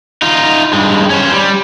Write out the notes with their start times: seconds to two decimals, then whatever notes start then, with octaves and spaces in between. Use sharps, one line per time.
0.22 D#4 F4
0.73 G2 G#3
1.10 C#4 C5
1.32 G3